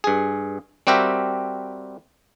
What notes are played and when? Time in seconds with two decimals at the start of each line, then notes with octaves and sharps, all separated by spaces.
0.04 G2 G#4
0.87 G3 C4 F#4 G4 A#4 E5